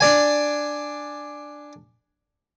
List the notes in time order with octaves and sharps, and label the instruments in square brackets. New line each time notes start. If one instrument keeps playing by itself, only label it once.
[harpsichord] D4 D5 G#5